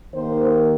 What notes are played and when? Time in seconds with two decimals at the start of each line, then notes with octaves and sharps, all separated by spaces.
0.14 D#2 D#3 A#3 C5